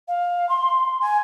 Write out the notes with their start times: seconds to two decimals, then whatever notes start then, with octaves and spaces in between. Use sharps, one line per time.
0.08 F5
0.49 C6
1.01 G#5